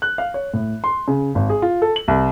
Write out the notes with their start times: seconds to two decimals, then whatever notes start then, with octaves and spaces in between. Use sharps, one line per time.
0.02 F#6
0.18 F5
0.34 C#5
0.54 A2
0.84 C6
1.08 C#3
1.35 G#1
1.50 G#4
1.62 F4
1.82 A4
1.96 F#7
2.08 C2